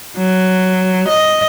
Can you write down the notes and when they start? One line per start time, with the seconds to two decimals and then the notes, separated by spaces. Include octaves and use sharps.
0.17 F#3
1.09 D#5